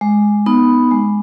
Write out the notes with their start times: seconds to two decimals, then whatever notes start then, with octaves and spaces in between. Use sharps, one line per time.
0.01 G#3
0.46 B3 D#4
0.91 G#3